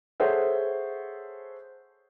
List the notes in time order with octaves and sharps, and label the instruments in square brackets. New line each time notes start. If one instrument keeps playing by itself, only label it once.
[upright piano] G#4 A4 C5 C#5 E5 F#5